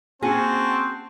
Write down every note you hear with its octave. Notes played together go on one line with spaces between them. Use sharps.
A#3 C4 C#4 F#4 G#4 A5